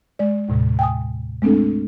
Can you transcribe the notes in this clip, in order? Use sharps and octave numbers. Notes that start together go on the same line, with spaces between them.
G#3 D5
D#2 A2 C3
G5 G#5 D#6
G#3 A3 C4 D4 A4